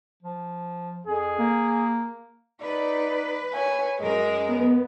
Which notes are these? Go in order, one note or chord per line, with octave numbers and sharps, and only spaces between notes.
F3
F2 G#4
A#3
D#4 B4 D5
C#5 G#5
F#2 G#3 A#4
B3